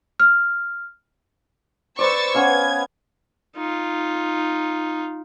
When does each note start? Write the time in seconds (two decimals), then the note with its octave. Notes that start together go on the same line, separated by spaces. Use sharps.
0.20 F6
1.99 B4 C5 D5 C#6 E6 A6
2.34 B3 C#4 F5 G#6
3.56 D#4 F4